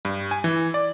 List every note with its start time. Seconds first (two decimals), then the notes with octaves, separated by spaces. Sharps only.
0.05 G2
0.31 G#5
0.44 E3
0.74 D5